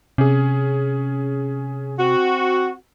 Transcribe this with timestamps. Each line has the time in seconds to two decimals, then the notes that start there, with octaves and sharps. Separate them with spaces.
0.18 C3 C#4 G#4
1.99 C4 F#4